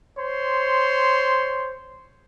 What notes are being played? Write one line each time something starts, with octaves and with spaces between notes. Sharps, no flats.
C5 C#5 C6